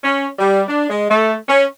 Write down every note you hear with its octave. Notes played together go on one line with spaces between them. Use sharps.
C#4
G3
D4
G#3
A3
C#4